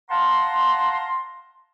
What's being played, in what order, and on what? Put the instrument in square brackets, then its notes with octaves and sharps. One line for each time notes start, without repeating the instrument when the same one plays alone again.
[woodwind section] F5 F#5 A5 A#5 C6